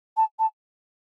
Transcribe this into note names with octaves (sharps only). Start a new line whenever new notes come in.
A5
A5